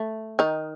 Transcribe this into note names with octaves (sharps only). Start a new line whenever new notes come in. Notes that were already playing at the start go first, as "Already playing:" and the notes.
Already playing: A3
D#3 D#4